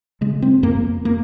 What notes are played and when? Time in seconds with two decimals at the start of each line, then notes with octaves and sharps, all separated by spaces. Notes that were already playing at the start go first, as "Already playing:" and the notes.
0.21 C#3 G#3
0.42 C4
0.63 F2 A#3
1.05 A#3